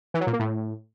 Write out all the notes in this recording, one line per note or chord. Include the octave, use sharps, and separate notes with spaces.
E3
F#3
A#2
A#3
A2